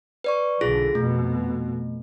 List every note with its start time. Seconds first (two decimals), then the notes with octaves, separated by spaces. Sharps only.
0.24 B4 D5 C#6
0.61 B1 D3 F4 G#4 A#6
0.95 F2 B2 A3